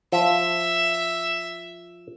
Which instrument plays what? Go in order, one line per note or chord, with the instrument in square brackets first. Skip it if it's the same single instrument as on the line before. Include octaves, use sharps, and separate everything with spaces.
[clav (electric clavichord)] F3 [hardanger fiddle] E5